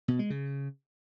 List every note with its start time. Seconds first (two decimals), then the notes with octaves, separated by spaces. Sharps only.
0.08 B2
0.19 G#3
0.30 C#3